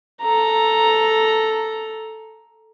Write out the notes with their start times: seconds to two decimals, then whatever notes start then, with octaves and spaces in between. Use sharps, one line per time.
0.21 A4 A#5